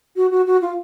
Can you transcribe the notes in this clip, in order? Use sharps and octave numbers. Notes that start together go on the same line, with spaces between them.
F#4
F#4
F#4
F4